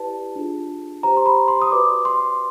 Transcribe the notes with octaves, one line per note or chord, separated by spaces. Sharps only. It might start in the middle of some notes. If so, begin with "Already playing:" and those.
Already playing: E4 G4 B4 D5 A5
D4 F4 G#4
G4 C5 A#5
C6
B5
C6
D#6
F#4 B4 D5 D6
C6